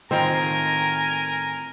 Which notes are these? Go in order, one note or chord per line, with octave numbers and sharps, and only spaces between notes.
A2 D#3 C4 F4 A#4 G#5